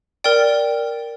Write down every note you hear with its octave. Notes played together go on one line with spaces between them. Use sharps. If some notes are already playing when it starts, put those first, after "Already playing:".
A#4 D5 G5